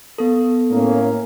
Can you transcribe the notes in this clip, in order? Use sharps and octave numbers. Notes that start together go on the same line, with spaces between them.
B3 A4
A2 A#3 C#4